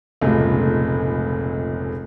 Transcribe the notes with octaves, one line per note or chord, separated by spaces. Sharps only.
F1 C#2 A#2 G#3 A3